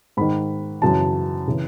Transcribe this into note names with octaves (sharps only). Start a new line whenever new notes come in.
G#2 D#3 B5
F#2 C#3 E3 A5
C#3 E3